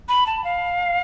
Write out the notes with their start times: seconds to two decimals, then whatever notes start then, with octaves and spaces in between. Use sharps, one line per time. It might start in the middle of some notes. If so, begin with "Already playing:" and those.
0.09 B5
0.27 A5
0.44 F5